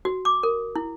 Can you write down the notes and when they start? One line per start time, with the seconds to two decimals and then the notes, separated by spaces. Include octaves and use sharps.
0.05 F#4
0.25 D6
0.43 A#4
0.76 E4